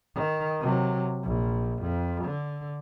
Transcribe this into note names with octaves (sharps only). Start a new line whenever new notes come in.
D#3
C3 F#3
A#1
F2
D3